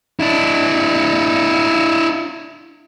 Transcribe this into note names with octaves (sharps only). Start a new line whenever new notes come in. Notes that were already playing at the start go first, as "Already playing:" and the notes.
D4 E4